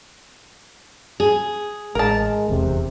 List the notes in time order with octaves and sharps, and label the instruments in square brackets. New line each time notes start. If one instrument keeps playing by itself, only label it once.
[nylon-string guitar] G#4
[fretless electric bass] A1 [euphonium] G#3 [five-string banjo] A#4 A5
[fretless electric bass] F1 B1 E2 [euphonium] C3